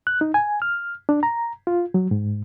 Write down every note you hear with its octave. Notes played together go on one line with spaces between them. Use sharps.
F#6
D#4
G#5
F6
D4
A#5
F4
F#3
G#2